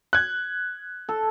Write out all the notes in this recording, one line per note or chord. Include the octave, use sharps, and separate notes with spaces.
F#6 G#6
A4